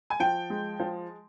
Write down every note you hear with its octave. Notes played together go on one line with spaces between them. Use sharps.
G#5
F3 G5
G#3
F3